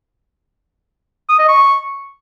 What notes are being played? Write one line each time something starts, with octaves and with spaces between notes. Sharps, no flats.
D#6
D#5
C#6